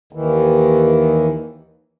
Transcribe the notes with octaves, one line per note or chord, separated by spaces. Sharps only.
D#2 D#3 E3